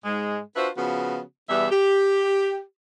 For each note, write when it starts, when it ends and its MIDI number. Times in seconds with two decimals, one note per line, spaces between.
0.05 0.38 44
0.05 0.38 56
0.56 0.69 62
0.56 0.69 65
0.56 0.69 66
0.56 0.69 71
0.56 0.69 72
0.56 0.69 76
0.77 1.20 49
0.77 1.20 53
0.77 1.20 59
0.77 1.20 66
1.50 1.70 40
1.50 1.70 47
1.50 1.70 55
1.50 1.70 59
1.50 1.70 76
1.70 2.60 67